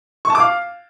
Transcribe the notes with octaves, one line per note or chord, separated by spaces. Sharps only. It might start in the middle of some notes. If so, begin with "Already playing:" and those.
C#6
A5
D6
F5